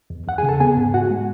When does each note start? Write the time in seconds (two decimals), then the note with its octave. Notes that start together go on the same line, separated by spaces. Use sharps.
0.10 E2
0.27 E2 F#5
0.38 G#4 G#5
0.43 C#3
0.49 A4 A5
0.60 B3 G#4 G#5
0.77 G#2
0.94 G#2 F#4 F#5
1.10 G#3